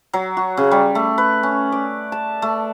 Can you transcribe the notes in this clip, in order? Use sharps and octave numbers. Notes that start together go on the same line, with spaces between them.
F#3
F#4
C#3
G3
A3
B4
C#4
D5
A5
A3